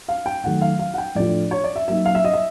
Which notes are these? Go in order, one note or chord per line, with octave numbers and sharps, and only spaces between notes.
F5
G5
D#3 F#3 A3 F#5
F5
F5
F#5
G5
A2 F3 A3 D4 F4 D5
C#5
D5
E5
F#3 A#3 D#4 E5
F5
E5
D#5
E5